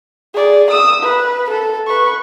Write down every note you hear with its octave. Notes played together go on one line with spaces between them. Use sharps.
G#4 D5
D#6 E6
B4
A4
B4 C#6